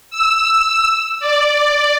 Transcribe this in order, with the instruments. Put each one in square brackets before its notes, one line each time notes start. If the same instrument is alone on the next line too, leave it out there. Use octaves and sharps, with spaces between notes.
[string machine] E6
D5